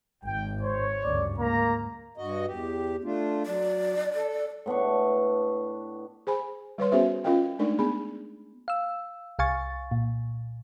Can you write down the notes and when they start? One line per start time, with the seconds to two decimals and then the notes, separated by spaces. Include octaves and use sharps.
0.24 G#1 G5
0.61 C5 C#5
1.04 D2 G2 C#3 D5
1.39 G#2 A#3 A#5
2.17 G2 F#4 D#5
2.47 E2 G4
3.04 A3 D4 F4
3.46 F#3 D5
4.15 A4
4.66 A2 B3 D4 C#6
6.27 G#4 C5 G#5 B5
6.78 G3 B4 C#5 C6
6.92 B3 C#4 F#4 G#4 C5 E5
7.24 C#4 F4 A#4 D#5 F5 G5
7.59 G#3 A3 D4 D#4 A#4 D5
7.79 B3 G#4 B5
8.68 F5 E6
9.39 C2 F5 G#5 C#6 A6
9.91 A#2